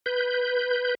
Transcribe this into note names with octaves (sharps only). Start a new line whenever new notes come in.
B4 G6